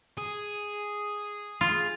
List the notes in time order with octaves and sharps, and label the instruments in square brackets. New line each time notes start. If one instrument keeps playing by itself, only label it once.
[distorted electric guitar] G#4
[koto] F4